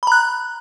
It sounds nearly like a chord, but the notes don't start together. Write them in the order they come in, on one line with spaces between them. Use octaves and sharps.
B5 A#5 F#6